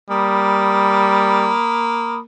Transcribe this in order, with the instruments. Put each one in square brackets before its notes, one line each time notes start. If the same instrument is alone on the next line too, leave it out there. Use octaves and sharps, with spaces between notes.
[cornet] G3 [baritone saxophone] A#3 [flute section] B5 D#6